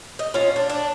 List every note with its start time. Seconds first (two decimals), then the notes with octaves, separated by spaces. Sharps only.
0.19 D#5
0.34 C#4 F4
0.56 D4
0.70 D4